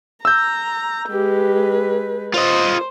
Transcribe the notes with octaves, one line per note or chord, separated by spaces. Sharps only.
A#5 E6 G6
G#3 G4 B4
F4 C5 D#5